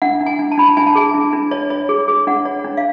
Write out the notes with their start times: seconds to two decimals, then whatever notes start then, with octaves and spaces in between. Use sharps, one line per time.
0.02 D4 F#5
0.21 D4
0.26 G#5
0.39 D4
0.52 A5
0.57 D4 B5
0.67 A5
0.77 D4 G#5
0.87 A5
0.95 G#4 G#5
1.14 D4
1.33 D4
1.51 C#5
1.70 C#5
1.89 G#4
2.08 G#4
2.27 D4 F#5
2.45 C#5
2.64 D4
2.77 F5